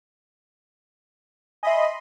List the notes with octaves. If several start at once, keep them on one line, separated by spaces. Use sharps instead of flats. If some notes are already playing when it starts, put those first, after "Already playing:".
D#5 E5 G#5 B5 C6